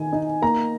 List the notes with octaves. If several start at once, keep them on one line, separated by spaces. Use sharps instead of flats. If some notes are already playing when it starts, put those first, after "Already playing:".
Already playing: D#3 D#4 G#5
D#4
A#3 A#5